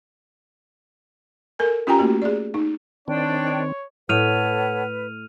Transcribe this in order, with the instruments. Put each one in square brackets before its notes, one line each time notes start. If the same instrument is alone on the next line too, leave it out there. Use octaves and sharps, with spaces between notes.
[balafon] A4 A#4 G#5
C#4 F4 G4 G5 G#5 A#5
A3 A#3 F#4 G4
G#4 D5
D#4
[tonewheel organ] D#3 C4 [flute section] D4 G5 [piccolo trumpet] C#5
[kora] A2 [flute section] A4 C#5 F#5 [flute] B4 [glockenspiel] F6 D#7 F7